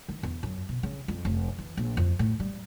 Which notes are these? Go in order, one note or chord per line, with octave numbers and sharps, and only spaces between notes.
D#3
E2
F#2
B2
C#3
F2
F1
E3
A#1
F2
A2
G3